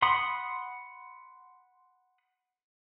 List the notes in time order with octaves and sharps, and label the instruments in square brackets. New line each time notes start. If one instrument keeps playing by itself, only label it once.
[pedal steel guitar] F#5 B5 C6 D#6